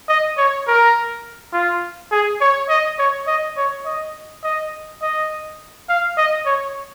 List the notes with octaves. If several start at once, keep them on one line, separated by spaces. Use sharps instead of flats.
D#5
C#5
A#4
F4
G#4
C#5
D#5
C#5
D#5
C#5
D#5
D#5
D#5
F5
D#5
C#5